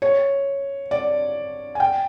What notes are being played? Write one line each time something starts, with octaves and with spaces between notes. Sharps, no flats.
C#5
D5
G#5
G5